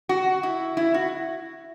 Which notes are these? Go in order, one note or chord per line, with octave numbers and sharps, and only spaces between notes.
F#4
E4
E4
F#4